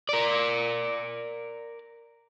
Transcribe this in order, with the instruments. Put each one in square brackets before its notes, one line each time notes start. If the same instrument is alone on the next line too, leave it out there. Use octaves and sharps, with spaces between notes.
[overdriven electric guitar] A#4 D5